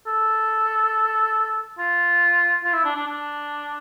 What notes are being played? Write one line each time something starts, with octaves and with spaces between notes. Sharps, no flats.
A4
F4
F4
E4
D4
D4
D4